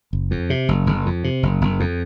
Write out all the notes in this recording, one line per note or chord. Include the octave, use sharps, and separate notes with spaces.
F#1
F2
C3
F#1
F#1
F2
C3
F#1
F#1
F2